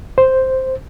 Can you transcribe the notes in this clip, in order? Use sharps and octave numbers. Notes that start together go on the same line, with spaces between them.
C5